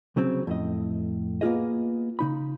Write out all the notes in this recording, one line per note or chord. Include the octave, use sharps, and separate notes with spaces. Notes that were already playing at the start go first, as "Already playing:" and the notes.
C2 C#3 F#3 C4
F2 A2 D#5
A#3 B3 D4 F4 G#4 D#5
C#3 D#4 B5